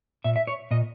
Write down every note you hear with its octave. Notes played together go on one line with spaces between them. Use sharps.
A#2 E5
E5
C#5
A#2 D#5